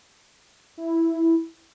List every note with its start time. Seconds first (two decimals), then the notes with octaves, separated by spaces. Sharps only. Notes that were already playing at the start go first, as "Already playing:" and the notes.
0.78 E4